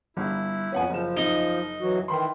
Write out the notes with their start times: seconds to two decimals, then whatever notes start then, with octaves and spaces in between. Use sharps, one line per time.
0.17 G1 E4
0.72 F2 B3 C#4 F#5 G#5
0.90 F#1 F3 E7
1.17 D#4
1.81 E3 F#3 F#4
2.08 D#3 E3 G5 B5 C6